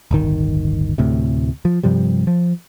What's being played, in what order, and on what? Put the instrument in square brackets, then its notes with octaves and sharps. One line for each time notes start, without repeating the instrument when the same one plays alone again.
[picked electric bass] D1 G1 D#3
D2 A2 C3
F3
G2 C3 F3 G3
F3